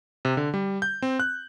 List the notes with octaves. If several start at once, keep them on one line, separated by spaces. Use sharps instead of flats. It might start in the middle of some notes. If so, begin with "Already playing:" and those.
C3
D3
G3
G6
C4
F#6